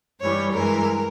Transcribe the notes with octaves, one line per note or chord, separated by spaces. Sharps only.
G2 E3 G3 C#5
G2 E3 G#3 A#4